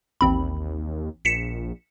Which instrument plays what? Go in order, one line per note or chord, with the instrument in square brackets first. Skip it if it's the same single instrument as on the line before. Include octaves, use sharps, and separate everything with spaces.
[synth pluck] A1 C4 B5 [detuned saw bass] D#2
[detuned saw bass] A#1 [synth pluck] B6 C#7 E7